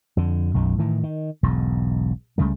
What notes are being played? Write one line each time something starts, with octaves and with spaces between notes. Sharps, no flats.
F2 D3
B1 F#2 D#3
A2 D#3 E3
D#3
E1 B1 G#2
C#2 C#3 G3 A3